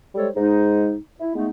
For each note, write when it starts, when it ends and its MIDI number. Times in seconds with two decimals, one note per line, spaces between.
0.15 0.29 55
0.15 0.29 56
0.15 0.29 69
0.15 0.29 72
0.15 0.29 73
0.35 0.93 44
0.35 0.93 56
0.35 0.93 63
1.20 1.32 64
1.35 1.49 56
1.35 1.49 57
1.35 1.49 59
1.35 1.49 63